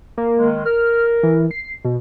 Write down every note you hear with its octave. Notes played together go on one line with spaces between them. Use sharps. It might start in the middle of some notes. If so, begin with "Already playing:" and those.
A#3
D#3 G#3
A#4 F6
E3
C7
B2